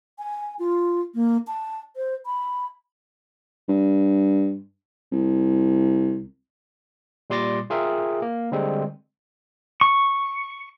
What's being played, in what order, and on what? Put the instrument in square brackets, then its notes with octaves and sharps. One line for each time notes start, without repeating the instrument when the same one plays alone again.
[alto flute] G#5
F4
A#3
A5
C5
B5
[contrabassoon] G2
C2
[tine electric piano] A#2 G3 C6 D6 A6 A#6
F4 G#4 A#4 E5 G5
A#3
D3 G3 G#3 C4
[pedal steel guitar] C#6